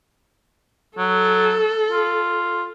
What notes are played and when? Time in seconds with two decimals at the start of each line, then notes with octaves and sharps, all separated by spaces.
0.98 F#3 A4
1.91 F4